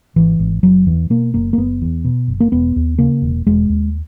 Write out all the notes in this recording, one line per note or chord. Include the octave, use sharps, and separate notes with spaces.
G#1 E3
G#1
F#1 F#3
E2 E3
B2 A#3
F#1 A#3
A#3
F#1 B3
E2
B2
F#1
A#3
E1 B3
D#2
C#3 A#3
E1
E1 G#3
D#2